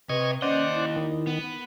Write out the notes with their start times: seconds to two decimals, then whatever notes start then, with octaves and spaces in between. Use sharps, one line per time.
0.09 C3 B4 D#5 C#6 G#6
0.42 D#2 C#4 C5 D5 D#5 F#5
0.73 E4
0.96 D#3
1.27 B3